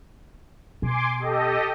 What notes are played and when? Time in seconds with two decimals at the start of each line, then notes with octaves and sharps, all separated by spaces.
0.82 B2 G#5 C6 D6
1.19 G4 A4 D#5